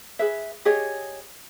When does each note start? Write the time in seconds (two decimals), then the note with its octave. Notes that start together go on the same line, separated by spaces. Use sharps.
0.19 G#4 B4 E5
0.65 G4 G#4 C#5 D#5